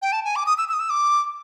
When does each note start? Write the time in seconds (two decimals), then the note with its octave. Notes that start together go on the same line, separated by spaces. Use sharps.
0.02 G5
0.12 A5
0.25 G#5
0.36 D6
0.46 D#6
0.58 E6
0.69 E6
0.73 D#6
0.80 E6
0.90 D6